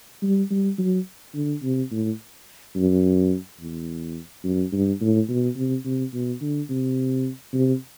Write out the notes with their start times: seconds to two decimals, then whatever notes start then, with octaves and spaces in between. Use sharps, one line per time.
0.22 G3
0.50 G3
0.78 F#3
1.34 D3
1.62 C3
1.91 A2
2.76 F#2
3.60 E2
4.44 F#2
4.72 G2
5.01 A2
5.28 B2
5.56 C3
5.85 C3
6.13 B2
6.41 D3
6.69 C3
7.53 C3